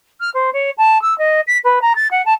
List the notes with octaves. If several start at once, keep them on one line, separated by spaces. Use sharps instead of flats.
F6
C5
C#5
A5
E6
D#5
B6
B4
A#5
A6
F#5
A5